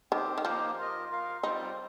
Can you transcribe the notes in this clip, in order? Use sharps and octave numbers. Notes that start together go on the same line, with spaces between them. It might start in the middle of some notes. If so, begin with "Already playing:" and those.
D#3 C4 G4 C5
D#3
F3 A#3 D#4 G4 C5
F4 A#4 D#5
F4 A#4 F5
G3 C4 D#4 F4 C5